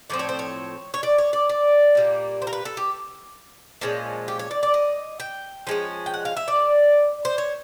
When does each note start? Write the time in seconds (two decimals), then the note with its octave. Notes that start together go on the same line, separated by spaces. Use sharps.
0.10 A2 F3 C4 D5
0.19 C#5
0.29 C5
0.39 C#5
0.94 C#5
1.03 D5
1.18 C#5
1.33 D5
1.49 D5
1.95 A#2 G3 A#3
2.42 C5
2.47 A#4
2.53 B4
2.65 A4
2.77 G4
3.81 A#2 F3 G#3 C#4
4.28 G4
4.39 C#5
4.51 D5
4.63 D5
4.74 D#5
5.20 G5
5.67 F3 G#3 C#4
6.06 G5
6.14 F#5
6.25 F5
6.37 E5
6.48 D5
7.25 C5
7.38 C#5